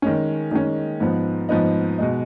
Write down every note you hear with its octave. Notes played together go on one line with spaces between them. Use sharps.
D#3 G#3 C#4
D#3 G#3 C#4
G#2 F3 B3 D#4
G#2 F3 B3 D#4
B2 G#3 D#4